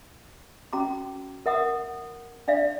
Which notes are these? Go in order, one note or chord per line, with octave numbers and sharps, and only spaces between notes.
C#4 F#4 A#5 D6
A#4 E5 F#5 D#6 E6
D4 D5 E5 F5